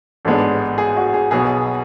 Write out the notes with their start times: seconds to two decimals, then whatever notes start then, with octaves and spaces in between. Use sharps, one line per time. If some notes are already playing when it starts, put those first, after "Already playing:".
0.25 A1 G#2 G#3 B3 D4 A4
0.78 G#4
0.97 F#4
1.14 G#4
1.31 B1 B2 F#3 B3 G#4